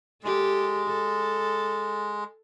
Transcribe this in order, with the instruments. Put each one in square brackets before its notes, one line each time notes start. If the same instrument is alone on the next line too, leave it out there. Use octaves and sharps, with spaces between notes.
[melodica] G#3 [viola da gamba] G4 A4
[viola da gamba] A4